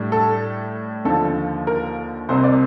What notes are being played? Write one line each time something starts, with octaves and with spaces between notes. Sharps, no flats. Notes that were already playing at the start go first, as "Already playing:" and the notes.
Already playing: A2 G3 D4
A4
D#2 D3 F3 A4
A#4
C2 C3 G3 C4 C5
D5